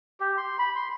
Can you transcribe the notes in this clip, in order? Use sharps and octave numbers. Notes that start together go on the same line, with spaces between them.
G4
C6
B5
C6